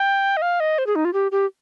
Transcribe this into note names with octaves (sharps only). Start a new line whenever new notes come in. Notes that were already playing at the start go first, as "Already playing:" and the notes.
Already playing: G5
D#5
F5
D#5
C5
G#4
D#4
F4
G4
G4